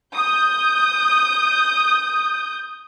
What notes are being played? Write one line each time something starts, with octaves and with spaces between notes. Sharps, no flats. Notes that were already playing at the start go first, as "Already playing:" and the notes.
D#6 G6